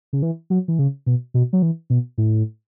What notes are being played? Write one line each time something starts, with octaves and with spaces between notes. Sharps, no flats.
C#3
E3
F#3
E3
C#3
B2
B2
F#3
E3
B2
A2